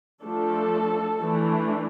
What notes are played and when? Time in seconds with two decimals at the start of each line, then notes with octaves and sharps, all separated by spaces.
0.23 F3 A3 D4 A4
1.20 E3 A3 D4